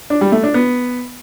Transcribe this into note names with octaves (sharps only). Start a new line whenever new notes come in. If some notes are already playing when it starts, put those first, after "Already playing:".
D4
G3
A3
D4
B3